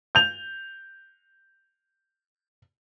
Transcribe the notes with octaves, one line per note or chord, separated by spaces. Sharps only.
G6 F7